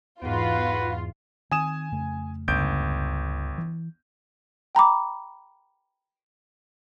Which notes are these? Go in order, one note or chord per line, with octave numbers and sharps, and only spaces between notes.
E2 G#2 F4 F#4 B4 D7
D#3 C4 G#5 D#6 E7
F2 C#3 A3
G1 C#2 G6 D7
E3
G5 A#5 B5 D6